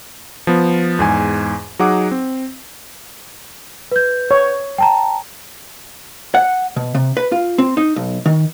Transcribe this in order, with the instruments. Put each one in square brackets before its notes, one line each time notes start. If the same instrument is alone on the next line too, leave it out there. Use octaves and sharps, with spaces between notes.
[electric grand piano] F3 B3
E2 G#2 G#5
F#3 D#4 G#4 F#5 D6
C4
[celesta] B4 G6
[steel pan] C#5
[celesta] G5 A5 A#5
[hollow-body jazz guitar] F#5
B2
C3
B4
F4
C4
D#4
B1
D#3